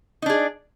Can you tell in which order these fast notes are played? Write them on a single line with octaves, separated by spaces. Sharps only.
D#4 D4 G#4